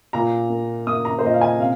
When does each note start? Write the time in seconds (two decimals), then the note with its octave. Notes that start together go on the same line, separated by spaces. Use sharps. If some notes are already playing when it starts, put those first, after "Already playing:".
0.13 A#2 A#5
0.50 A#3
0.87 A#3 D#6
1.05 A#5
1.19 C5
1.23 A#2 D#5
1.34 F5
1.41 G#5
1.60 C3 F5